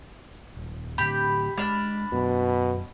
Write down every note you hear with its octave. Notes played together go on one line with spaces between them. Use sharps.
D#1
A2 D3 G4 B5
G#3 D4 F6
F#2 B2 F#3 B3